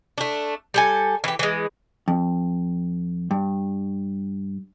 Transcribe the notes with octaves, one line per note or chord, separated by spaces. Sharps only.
A3 D4
G3 A4 G#5
E3 G4
E3 G#3
F2
G2